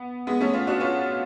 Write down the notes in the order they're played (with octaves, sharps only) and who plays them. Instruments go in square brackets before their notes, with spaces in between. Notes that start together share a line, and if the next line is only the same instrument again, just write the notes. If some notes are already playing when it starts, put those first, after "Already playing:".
Already playing: [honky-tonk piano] B3
G#3 B3
A3 C#4
C#4 F4
D4 F#4
C#4 F4